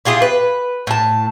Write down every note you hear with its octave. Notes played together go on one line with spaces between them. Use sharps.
E4 F4 G4 G#4
B4
A2 A5